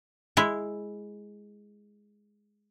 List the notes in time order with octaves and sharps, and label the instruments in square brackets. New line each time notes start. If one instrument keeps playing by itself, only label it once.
[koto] G#3 E4